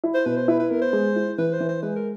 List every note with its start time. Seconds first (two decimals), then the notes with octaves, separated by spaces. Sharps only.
0.04 E4
0.15 C5
0.25 B2 B4
0.36 C5
0.48 E4 B4
0.59 B4
0.71 B3 A#4
0.82 C5
0.93 G#3
1.16 E4
1.38 E3 B4
1.53 C5
1.60 E3
1.69 C5
1.82 G#3 B4
1.96 A#4